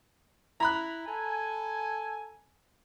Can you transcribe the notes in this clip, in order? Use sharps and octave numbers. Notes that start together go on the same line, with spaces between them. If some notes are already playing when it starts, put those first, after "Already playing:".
E4 A#5 B5 F#6
A4 G#5